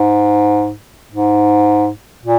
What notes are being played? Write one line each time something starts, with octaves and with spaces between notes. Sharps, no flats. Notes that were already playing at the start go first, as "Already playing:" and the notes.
Already playing: G#2
G#2
A#2